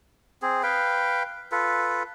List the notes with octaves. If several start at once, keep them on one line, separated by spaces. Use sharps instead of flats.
C4 G#4
B4 F5 G5
F4 A4 B4